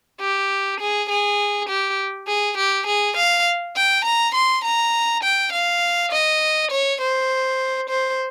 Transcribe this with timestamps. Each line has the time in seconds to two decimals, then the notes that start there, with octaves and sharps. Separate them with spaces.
0.21 G4
0.80 G#4
1.09 G#4
1.69 G4
2.27 G#4
2.57 G4
2.86 G#4
3.16 F5
3.76 G5
4.05 A#5
4.35 C6
4.64 A#5
5.23 G5
5.52 F5
6.12 D#5
6.71 C#5
7.01 C5
7.89 C5